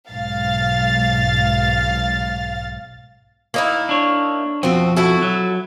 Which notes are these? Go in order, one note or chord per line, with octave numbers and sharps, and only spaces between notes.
B1 G#2 F5 A6
A#3 D#4 E4
D4 C#5
F2 B2 C4 F#4
E4 F#4 A4
F#3